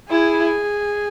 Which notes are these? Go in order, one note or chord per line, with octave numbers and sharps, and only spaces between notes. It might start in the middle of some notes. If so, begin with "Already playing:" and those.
E4 G#4